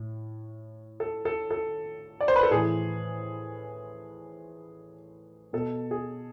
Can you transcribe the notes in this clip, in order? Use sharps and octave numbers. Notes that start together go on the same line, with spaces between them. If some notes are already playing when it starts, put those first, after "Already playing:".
Already playing: A2
A4
A4
A4
D5
C5
B4
A4
A2 E3 G#4
B2 A4
G#4